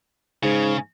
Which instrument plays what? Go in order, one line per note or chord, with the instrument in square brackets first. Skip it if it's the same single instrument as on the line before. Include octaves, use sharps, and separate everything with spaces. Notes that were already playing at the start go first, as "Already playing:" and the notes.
[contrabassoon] G#2 [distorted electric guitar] C#3